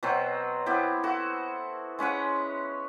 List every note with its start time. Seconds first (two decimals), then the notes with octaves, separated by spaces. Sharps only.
0.03 B2 F#3 C4
0.66 B3 C4 E4 G4
1.03 F#4 A4
1.99 G#3 C#4 B4 F#5